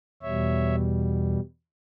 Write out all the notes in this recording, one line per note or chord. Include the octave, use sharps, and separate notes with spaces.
E2 B2 G3 C#5 E5